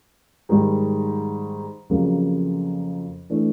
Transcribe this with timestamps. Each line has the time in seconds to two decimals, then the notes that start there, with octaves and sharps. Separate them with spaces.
0.49 G#2 D#3 G3
1.90 F2 C#3 F#3 A#3
3.30 E3 A3 D4